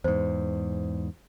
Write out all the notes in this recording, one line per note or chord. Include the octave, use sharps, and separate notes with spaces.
E2 G#2 C5